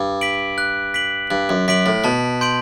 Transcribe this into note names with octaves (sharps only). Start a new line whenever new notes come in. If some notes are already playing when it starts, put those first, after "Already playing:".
Already playing: G2
B6 D7 F#7
F#6
B6 D7 F#7
G2 F#6
F#2
F#2 B6 D7 F#7
A2
B2 A5
C6 G6 D7 F#7